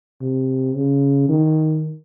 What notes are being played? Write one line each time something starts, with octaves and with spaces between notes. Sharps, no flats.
C3
C#3
D#3